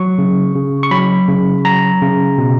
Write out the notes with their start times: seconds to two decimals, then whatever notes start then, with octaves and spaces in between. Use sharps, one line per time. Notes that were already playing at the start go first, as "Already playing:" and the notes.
Already playing: F#3 C#6
0.18 C#3
0.55 C#3
0.83 C#6
0.91 F#3 B5
1.28 C#3
1.65 F#3 A#5
2.02 C#3
2.38 B2